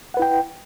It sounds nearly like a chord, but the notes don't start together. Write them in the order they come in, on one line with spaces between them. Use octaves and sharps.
F#5 B4 E4 G5